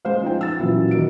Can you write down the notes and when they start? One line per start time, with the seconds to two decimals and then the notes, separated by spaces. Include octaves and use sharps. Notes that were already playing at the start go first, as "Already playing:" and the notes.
0.05 G#3 C5 F5
0.22 F3 D#4 G5
0.41 E6 A6
0.59 A#2 E3 F#3 C#4 E4 F4
0.91 D#3 F#4 D7